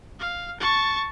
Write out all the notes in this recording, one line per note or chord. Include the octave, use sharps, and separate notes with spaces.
F5
A5 C#6